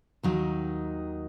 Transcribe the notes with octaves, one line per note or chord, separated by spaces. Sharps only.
D#2 D#3 F#3 D#4